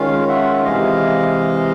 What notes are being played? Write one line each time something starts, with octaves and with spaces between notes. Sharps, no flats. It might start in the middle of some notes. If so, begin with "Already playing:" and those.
Already playing: D#3 G#3 C#4 F4 F5
E5 F#5
C3 E3 G#3 D#5 F5